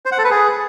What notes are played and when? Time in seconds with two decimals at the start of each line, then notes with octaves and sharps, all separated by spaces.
0.06 C5
0.12 F#5
0.18 A4
0.24 B4
0.31 G#4